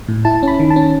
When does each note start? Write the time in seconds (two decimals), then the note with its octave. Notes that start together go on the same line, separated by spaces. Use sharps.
0.08 A2
0.25 E4 A5
0.43 C#4 B5
0.60 D#3
0.70 A5
0.76 C#4